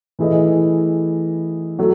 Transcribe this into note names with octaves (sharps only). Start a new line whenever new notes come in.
E3 A3 E4 G#4 D#5
F#3 A3